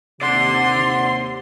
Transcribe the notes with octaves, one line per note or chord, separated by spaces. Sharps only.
D#2 C3 D5 F#5 C6